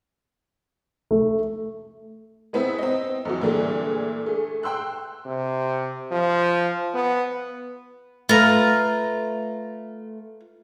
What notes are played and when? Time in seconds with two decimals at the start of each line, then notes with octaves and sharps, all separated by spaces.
1.11 A3
2.53 G#3 B3 C4 E4
2.78 C4 D#5
3.25 F2 E3 F#3
3.41 A#2 D3 E3 G3 A3 G#4
4.26 A3 G#4
4.63 G5 C6 E6 F#6
5.26 C3
6.11 F3
6.94 B3
8.29 A3 F4 B4 A#5